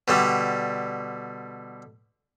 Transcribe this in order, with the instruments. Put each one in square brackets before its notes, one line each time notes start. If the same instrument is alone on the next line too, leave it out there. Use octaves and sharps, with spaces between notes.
[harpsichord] B2 D3 G3